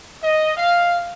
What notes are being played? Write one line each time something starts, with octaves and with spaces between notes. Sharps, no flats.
D#5
F5